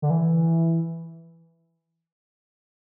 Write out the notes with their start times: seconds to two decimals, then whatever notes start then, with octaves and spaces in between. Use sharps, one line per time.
0.02 D3
0.10 E3